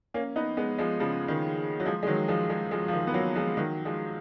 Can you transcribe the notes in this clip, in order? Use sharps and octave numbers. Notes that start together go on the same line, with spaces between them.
A#3 C#4
B3 D#4
G#3 B3
F3 G#3
C#3 F3
D#3
F#3
F3 G#3
G#3
D#3 F#3
F3 G#3
F3 G#3
F3 G#3
F3
D#3
B3
F#3 A#3
F3 G#3
D#3 F#3
F3 G#3